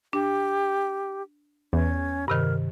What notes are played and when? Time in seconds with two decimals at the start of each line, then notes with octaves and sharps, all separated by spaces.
0.13 D4 G4
1.73 E2 C#4
2.28 G2 C3 D#3 A#4